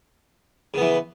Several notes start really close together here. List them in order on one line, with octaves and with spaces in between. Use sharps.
C#3 B3 E3